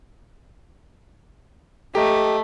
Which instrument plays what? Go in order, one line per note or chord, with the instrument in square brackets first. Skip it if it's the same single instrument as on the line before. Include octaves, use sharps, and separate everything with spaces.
[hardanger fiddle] A3 [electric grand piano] G4 A#5 [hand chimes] A4 D#5